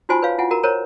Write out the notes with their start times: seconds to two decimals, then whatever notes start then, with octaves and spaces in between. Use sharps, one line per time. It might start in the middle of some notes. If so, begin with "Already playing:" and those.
0.09 D#4 F4 F#4 C5 G#5 C6
0.22 B4 C#5 F5
0.38 E4 F4 F#5 G#5
0.51 F#4 A#4 A#5
0.63 A#4 C5 C#5 A#5